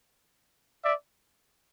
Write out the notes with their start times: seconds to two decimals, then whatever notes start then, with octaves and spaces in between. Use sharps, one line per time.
0.83 D5 E5